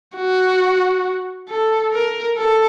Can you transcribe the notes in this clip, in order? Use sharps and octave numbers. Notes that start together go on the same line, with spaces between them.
F#4
A4
A#4
A4